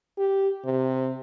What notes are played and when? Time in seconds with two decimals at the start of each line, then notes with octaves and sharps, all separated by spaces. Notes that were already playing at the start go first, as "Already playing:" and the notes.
0.18 G4
0.65 C3